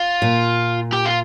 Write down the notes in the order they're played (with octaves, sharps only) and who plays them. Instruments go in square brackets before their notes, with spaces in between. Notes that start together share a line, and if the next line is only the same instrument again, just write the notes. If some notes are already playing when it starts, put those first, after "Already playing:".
Already playing: [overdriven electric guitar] F4
[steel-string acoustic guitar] A#2
[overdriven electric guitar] G4
F4